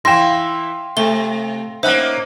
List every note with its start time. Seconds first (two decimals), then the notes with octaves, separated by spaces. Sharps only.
0.05 E3 E4 F5 G5 C6 A#6 E7
0.97 C3 A3 G7
1.83 A#3 C#4 D#4 C5 E5 F#5 B5